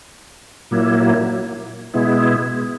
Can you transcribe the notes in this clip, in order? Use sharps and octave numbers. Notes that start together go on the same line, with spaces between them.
A#2 F#3 A#3 E4
B2 G#3 B3 E4